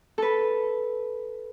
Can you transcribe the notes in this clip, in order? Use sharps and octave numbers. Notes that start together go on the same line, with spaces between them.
A4 B4